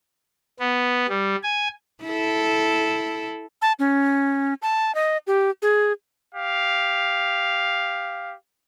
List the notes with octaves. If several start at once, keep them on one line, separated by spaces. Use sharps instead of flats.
B3
G3
G#5
E4 A4
A5
C#4
A5
D#5
G4
G#4
G4 F5